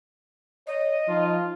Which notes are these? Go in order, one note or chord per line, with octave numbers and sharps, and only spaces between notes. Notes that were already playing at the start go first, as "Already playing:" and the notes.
C#5 D#5
F3 D#4 F4